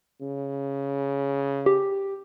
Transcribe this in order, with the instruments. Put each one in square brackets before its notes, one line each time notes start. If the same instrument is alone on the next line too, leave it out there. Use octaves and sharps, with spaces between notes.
[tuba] C#3
[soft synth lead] G4